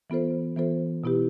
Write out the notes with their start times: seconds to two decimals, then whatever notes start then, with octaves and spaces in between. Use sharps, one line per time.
0.10 E3 B3 F4 A4 C5
0.56 E3 B3 F4 A4 C5
1.04 B2 B3 E4 G4 B4